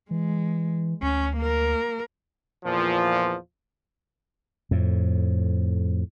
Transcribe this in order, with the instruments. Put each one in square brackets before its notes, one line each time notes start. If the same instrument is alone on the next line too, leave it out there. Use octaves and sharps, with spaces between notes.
[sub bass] E3 [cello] G#3
[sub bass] D2 [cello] C#4
[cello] A#3 A#4
[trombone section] E2 A#2 F3
[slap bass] F2 A2